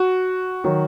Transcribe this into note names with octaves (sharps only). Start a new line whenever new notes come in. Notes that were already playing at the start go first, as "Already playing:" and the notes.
Already playing: F#4
D#3 F#3